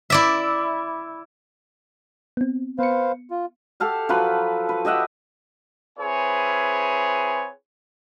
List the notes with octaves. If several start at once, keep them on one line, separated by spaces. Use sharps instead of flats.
E4 D5 E5
B3 C4
B3 B4 C5 F5 C#7
F4
G4 A4 F5 F#5
F3 F#3 F4 B4
B4
G4 D#5 E5 F#5
C4 E4 G#4 B4 C#5 G#5